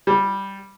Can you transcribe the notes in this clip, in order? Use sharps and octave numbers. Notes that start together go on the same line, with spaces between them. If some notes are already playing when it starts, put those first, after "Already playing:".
G3